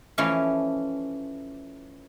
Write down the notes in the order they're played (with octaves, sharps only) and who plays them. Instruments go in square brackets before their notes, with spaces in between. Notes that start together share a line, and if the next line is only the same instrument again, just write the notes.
[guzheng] E3 F3 A3 C#4 F5